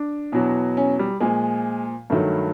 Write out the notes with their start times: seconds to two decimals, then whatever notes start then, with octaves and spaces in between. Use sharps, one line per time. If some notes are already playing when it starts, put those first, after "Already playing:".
Already playing: D4
0.32 E2 B2 F#3
0.77 C#4
0.99 G3
1.20 A#2 F3 G#3
2.10 G2 D#3 F#3 A3